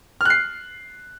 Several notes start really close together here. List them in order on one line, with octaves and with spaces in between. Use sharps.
F6 F#6 C7